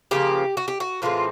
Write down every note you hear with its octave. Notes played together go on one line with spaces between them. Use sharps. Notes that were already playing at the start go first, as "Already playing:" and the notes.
C#3 F3 A#3 G4
F#4
G4
F#4
A2 E3 G#3 C4 F4